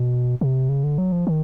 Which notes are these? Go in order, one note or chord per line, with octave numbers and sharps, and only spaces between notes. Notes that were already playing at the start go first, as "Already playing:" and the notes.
Already playing: B2
C3
C#3
D3
F#3
F3
D#3